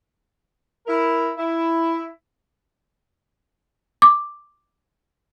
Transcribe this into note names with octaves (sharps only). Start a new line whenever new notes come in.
E4 A#4
E4
D6